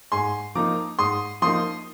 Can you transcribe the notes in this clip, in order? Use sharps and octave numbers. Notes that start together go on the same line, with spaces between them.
G#2 G#5 C6
F3 A#3 D#4 A#5 D6
G#2 C6 D#6
F3 A#3 D#4 C6 D#6